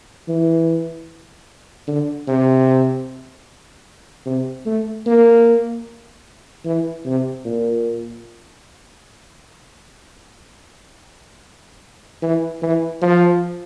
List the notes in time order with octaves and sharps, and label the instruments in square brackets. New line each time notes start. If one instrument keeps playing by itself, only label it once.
[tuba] E3
D3
C3
C3
A3
A#3
E3
C3
A#2
E3
E3
F3